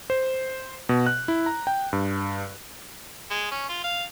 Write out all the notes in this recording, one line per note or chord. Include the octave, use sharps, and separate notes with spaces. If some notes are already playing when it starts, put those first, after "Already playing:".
C5
B2
F#6
E4
A#5
G5
G2
G#3
C#4
F4
F5